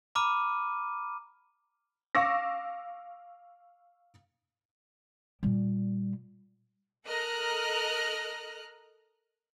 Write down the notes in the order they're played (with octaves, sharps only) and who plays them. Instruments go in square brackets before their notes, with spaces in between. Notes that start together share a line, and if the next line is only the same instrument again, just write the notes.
[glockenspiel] A#5 B5 D6 F6 D#7
[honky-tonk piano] F5 C#6 D6 E6 A#6
[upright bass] A#2 G3
[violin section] A4 A#4 D#5 A#5 F6 F#6